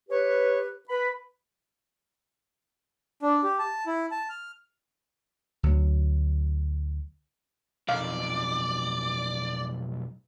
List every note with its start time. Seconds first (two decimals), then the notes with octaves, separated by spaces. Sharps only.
0.10 G4 B4 C#5
0.89 B4 B5
3.22 D4
3.43 G4
3.59 A5
3.86 E4
4.11 A5
4.29 F6
5.63 D2 F#3
7.89 B1 F2 D5 F5